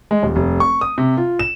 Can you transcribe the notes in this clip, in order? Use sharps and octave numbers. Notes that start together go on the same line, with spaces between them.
G#3
D#1
F1
C#6
D#6
C3
F4
E7